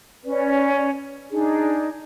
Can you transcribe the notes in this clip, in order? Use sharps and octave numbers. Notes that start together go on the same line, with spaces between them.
C#4 B4 D5
D4 D#4 G#4